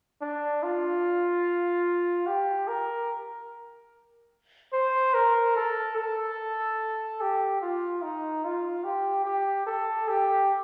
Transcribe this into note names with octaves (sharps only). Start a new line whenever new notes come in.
D4
F4
G4
A#4
C5
A#4
A4
A4
G4
F4
D#4
F4
G4
G4
A4
G4